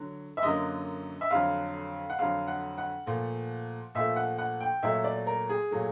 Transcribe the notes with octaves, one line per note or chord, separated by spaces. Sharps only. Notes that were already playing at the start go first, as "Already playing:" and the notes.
Already playing: D3 F#3
E5
F#2 D3 F#3 A#3 D#5
E5
F2 D3 F#3 F5
F#5
F2 D3 F#3 F5
F#5
F#5
A#2 F3 A3
A#2 F3 A3 E5
F#5
F#5
G5
A#2 F#3 A3 E5
D5
A#4
G#4
A#2 F#3 A3